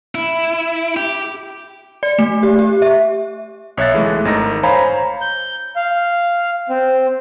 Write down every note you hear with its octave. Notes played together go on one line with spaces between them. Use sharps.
E4
G4
D5
A3
G4
G4
E5
B1 C#5 E5 F#6 A6
E3 G#3 A3
G#1 D#3 D#4 A#6
C5 C#5 F5 G#5 A#5 B5
G6
F5
C4